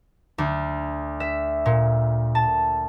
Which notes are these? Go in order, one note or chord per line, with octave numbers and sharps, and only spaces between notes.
D2
E5
A#2
A5